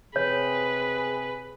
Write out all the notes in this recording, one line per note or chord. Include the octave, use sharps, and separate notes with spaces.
C3 G#4 B4 C#5